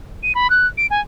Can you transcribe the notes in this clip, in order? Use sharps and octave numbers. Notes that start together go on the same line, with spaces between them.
D#7
B5
F#6
D7
G#5